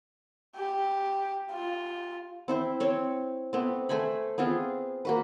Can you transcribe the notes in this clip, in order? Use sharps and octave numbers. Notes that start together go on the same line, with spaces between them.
G4
F4
C4 E4 C5
C4 C#5
A3 B3 C4
A3 C5 G#5 B5
B3 C4 F4 G#4
A#3 F#4 B4